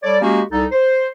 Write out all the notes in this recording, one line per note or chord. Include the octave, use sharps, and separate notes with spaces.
G3 A4 C#5 D5
G#3 A#3 C#4 F#4 G4
C2 D#4 A4
C5